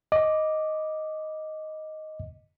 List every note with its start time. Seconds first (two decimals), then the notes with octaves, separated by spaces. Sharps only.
0.12 D#5 D6